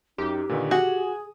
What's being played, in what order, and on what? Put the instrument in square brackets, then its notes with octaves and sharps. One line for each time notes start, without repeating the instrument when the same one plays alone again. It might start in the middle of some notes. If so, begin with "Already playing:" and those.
[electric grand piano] F#2 [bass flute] D#4 [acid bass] G4
[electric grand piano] A#2 D3 D#3 [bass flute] B4
[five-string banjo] F#4 [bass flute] G#4 [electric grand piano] G#5 D#6